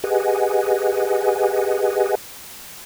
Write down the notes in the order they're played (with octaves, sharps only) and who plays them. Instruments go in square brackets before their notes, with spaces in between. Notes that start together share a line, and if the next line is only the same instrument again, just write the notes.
[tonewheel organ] G4 G#4 B4 D#5 F#5 G#5